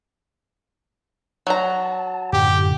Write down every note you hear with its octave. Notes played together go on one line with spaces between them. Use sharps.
F#3 A5 A#5
F#2 A2 D3 G4